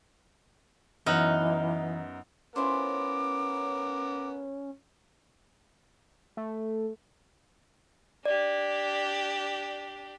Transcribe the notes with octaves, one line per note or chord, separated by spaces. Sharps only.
F#2 E3 B3 D#4 F#5 E6 F6 A#6
B3 C#4 E4 F4 A#4 C5 D6
A3
D4 G4 D5